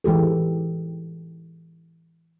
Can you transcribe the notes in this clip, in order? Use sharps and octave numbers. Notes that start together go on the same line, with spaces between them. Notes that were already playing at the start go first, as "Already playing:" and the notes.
E3 G#3 G4 A4